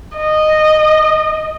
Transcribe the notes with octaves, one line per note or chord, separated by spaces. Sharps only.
D#5